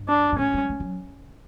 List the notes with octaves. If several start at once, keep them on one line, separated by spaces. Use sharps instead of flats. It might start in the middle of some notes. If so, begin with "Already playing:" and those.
Already playing: G2
D4
G2
A2 C#4
G3
A3
F#3